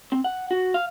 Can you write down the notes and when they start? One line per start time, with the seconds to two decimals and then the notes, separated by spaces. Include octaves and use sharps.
0.12 C4
0.24 F#5
0.51 F#4
0.74 F5